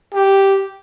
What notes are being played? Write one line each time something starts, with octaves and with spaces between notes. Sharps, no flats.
G4